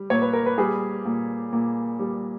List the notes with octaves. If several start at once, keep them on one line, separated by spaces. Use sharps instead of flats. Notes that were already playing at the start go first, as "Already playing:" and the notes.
Already playing: G3
A#2 C#5
B4
A#4
B4
G3 G#4
A#2
A#2
G3